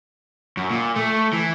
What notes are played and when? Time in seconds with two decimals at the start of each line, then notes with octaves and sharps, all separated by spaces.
0.57 F#2
0.71 A#2
0.96 A3
1.33 E3